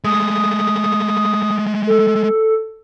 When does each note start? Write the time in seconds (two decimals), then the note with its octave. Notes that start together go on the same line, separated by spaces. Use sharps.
0.04 G#3 A3 D#6
1.87 A4